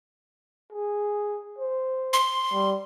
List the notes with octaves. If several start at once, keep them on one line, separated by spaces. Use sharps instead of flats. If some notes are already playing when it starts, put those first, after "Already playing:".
G#4
C5
C6
G3